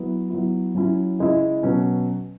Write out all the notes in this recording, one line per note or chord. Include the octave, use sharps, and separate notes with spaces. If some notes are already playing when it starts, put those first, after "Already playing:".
Already playing: F#3 B3 E4
F#3 B3 E4
F#3 C#4 E4
C#3 G#3 E4
B2 F#3 C#4